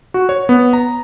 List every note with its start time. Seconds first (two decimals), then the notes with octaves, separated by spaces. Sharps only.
0.14 F#4
0.29 C#5
0.49 B3
0.73 A#5